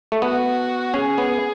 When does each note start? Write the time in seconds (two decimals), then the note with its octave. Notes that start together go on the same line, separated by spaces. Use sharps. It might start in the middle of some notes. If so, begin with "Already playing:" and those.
0.12 A3
0.22 B3 F#4
0.94 C#4 G#4
1.18 B3